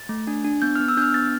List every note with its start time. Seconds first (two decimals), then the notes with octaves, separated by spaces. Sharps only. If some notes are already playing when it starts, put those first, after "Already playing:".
Already playing: A6
0.09 A3
0.27 D4
0.44 D4
0.62 B3 G6
0.76 B3 F6
0.88 E6
0.97 D4 G6
1.02 F6
1.14 B3 A6